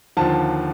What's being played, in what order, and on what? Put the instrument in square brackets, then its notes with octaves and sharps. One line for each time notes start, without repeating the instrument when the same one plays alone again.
[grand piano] D#2 D3 F3 A5